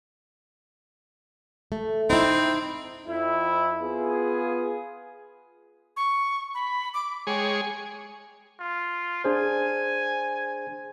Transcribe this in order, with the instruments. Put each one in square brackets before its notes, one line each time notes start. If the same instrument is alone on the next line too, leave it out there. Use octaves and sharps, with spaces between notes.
[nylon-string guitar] A3
[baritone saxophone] C4 [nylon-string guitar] D#4 E4
[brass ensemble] F2 E4
B3 F4 G#4
[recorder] C#6
B5
D6
[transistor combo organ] G#3 G#4 C#5 [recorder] G5
[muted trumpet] F4
[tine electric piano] D4 G#4 C5 [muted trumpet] G#5